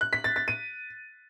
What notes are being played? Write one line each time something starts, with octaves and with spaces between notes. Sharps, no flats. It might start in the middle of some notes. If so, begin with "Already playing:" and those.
F#6
B6
A6
A6
D#7